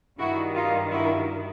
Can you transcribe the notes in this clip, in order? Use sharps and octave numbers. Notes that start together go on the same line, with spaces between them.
G2 D#3 G3 E4 F#4
D#4 F4
E4 F#4